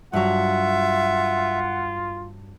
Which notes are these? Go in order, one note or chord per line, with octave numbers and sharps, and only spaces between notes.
G2 F#3 F4 E5 F#5